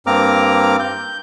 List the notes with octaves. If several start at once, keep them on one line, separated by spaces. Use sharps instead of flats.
G2 A#3 C4 A#5 D6 F6
G6